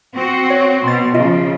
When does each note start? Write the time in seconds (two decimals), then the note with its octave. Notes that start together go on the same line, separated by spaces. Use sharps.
0.13 C4 F#4
0.50 C#5
0.84 B2 C6 A6
1.14 C#3 F3 F4 D#5 E5